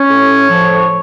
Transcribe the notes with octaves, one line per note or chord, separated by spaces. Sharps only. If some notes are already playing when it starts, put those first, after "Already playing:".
Already playing: C#4 C#5
A2
F3